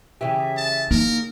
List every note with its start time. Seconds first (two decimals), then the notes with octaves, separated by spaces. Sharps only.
0.21 C#3 E3 G4 E5
0.57 A5
0.91 A#3 D#4 A#4